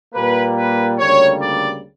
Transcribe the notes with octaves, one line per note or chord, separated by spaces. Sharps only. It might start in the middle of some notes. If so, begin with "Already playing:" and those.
A#2 G3 A#3 B4
B4
D2 C#3 G3 A#3 C#5
D5